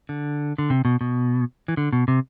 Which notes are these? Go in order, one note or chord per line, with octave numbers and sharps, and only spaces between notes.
D3
D3
C3
B2
B2
E3
D3
B2
C3